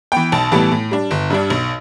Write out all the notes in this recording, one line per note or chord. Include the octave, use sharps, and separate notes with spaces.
E3 B3 G5
B1 A5
A2 E3 G3 B3 A5
A2
G3 D4
G1
G2 G3 D4
B1